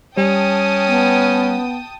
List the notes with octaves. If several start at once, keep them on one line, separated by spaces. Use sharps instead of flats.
G3 C#4 G5 A5 D#6
B3